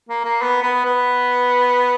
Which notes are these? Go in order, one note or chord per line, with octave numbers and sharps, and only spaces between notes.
A#3
A#3
B3
B3
B3